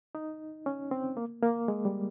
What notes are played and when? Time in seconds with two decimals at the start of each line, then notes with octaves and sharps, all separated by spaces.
0.15 D#4
0.66 C#4
0.91 C4
1.17 A#3
1.43 A#3
1.68 G#3
1.85 G3